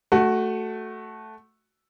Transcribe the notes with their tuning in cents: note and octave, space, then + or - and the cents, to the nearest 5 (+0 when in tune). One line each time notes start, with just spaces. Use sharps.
A3 +0 F#4 +10